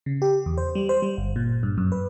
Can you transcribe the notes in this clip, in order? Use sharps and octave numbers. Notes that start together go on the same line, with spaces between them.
C#3
G4
E2
C5
G3
C5
G3
G1
A#2
G2
F#2
B4